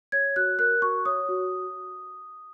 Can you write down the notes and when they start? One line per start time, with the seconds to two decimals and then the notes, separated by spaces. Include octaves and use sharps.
0.12 C#5 G#6
0.36 F#4 F#6
0.59 A#4 F#6
0.82 F#4 C#6
1.05 C#5 D#6
1.29 F#4